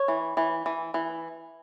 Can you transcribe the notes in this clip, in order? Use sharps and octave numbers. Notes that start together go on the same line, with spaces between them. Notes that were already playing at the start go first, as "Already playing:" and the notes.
Already playing: C#5
E3
E3
E3
E3